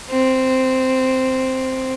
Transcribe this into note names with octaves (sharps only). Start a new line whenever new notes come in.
C4